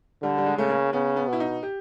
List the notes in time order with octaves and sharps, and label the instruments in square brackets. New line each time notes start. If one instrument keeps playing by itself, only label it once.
[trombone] D3 [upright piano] G3
[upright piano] G3
G#3
[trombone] C#3 [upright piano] A3
[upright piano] A#3
[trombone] C#3 [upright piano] B3
[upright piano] B3
[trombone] B2 [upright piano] E4
[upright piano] D#4
G4